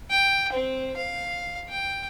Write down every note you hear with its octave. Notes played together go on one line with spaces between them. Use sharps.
G5
C4
F5
G5